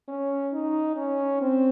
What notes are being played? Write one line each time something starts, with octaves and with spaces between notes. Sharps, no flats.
C#4
D#4
C#4
C4